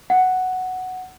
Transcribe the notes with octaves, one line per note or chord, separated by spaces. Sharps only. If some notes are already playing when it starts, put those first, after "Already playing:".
F#5